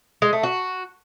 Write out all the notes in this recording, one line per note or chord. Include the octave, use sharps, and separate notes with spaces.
G#3
A3
F#4